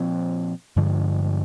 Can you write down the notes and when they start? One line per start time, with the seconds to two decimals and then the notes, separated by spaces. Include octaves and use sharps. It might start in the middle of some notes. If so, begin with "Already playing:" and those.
Already playing: A#2 F3 C4
0.76 G2 D3 F3 G#3